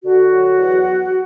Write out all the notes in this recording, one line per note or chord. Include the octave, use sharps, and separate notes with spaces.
D3 F#4
F#3
E2